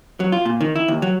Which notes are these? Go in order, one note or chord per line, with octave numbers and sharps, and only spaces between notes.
F#3
F4
A#2
D#3
E4
D#2
F#3